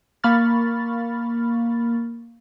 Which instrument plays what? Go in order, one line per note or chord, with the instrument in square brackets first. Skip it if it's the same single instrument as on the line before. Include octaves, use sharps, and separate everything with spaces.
[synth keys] A#3 B5 C#6 F6 A6